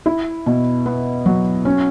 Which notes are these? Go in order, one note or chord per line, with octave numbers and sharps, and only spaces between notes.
E4
B2
B3
F#3
C#4